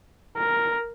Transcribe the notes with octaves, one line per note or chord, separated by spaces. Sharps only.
A#4